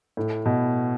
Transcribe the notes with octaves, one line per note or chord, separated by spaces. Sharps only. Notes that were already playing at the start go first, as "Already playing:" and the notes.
A2
B2